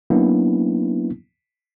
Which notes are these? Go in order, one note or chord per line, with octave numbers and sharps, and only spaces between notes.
F#3 A#3 B3 C#4 D4 E4